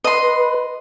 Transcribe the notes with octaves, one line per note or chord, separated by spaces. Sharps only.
B4 D#5 C6